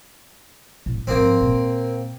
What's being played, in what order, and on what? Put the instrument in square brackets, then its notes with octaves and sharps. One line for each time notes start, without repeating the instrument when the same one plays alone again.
[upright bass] A2
[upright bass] G#2 F3 [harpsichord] A#3 C4
[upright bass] A#2